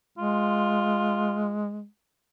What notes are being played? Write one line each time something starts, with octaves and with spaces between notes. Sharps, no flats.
G#3 F4